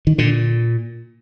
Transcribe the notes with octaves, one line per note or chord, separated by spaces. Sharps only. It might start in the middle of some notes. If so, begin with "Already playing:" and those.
D#3
A#2 D3